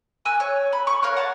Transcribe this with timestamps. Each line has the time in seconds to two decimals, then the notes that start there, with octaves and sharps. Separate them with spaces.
0.25 G#5 E6 F#6
0.40 C#5
0.73 B5
0.87 C#6
1.03 A#4 C#5 F5 F#6
1.17 F#5 A5